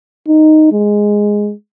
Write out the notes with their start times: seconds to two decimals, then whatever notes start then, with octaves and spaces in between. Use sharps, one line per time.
0.28 D#4
0.72 G#3